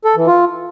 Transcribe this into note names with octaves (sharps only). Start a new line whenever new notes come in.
A4
E3
F4